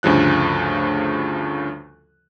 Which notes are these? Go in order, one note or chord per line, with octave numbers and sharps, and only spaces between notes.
D2 G2 C#3 F3 F#6